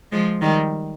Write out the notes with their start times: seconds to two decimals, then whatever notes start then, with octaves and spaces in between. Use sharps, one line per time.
0.12 F3 G#3
0.42 D#3 G3